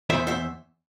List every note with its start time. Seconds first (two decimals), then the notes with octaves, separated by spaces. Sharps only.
0.10 E2 C5 E5
0.27 C5 E5